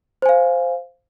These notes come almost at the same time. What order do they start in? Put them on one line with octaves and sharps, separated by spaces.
C5 G#5 F5